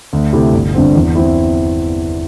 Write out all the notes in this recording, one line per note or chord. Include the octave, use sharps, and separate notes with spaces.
D2
C3 A3 E4 G4
G1
G2 D3 C4
E2
E3 C4 E4